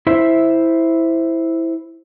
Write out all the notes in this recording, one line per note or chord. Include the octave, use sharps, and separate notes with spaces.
E4 C5 E5